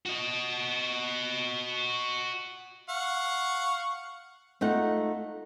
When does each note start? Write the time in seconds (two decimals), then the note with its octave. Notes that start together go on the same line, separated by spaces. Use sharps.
0.06 F#4 D#5
2.89 F5 F#5 C#6
4.61 A3 D#4 F4 F#5